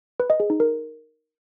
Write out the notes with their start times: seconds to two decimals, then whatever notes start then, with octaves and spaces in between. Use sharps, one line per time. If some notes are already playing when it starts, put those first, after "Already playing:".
0.20 B4
0.30 D#5
0.40 G#4
0.50 D#4
0.60 A#4